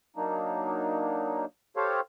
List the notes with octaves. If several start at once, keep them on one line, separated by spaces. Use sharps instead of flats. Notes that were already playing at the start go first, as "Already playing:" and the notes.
F#3 A#3 D4 D#4
G4 A4 C5 C#5 F5